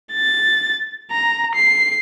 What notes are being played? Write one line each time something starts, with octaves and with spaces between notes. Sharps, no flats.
A6
A#5
C7